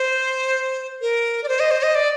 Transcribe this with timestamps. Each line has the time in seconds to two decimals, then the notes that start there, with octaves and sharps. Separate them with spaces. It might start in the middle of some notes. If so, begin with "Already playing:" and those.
Already playing: C5
1.01 A#4
1.44 D5
1.48 C5
1.60 D#5
1.71 C5
1.83 D#5
1.95 D5